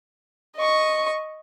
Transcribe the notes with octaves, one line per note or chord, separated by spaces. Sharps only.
D#5 C#6